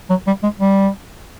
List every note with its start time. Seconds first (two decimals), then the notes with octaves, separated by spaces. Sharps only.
0.10 F#3
0.27 G3
0.43 G#3
0.59 G3